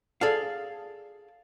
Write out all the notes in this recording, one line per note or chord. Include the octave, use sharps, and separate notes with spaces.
G#4 A4 D5 F5